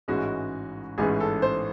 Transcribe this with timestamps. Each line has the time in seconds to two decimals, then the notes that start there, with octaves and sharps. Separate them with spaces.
0.08 A1 G#2 E3 G#3 C#4 F#4
0.98 A1 G#2 E3 G#3 C#4 G#4
1.20 A4
1.42 C5